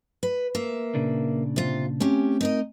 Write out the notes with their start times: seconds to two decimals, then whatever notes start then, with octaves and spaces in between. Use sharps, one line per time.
0.23 B4
0.55 A#3 E5
0.95 A#2 C#3 D4
1.56 C3 F4
2.00 A3 C4 C#4 G4 G#5
2.41 D#4 A#4 D#5